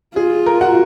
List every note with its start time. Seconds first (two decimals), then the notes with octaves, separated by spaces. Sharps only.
0.16 F4 G#4
0.46 A#4
0.61 F#4 F#5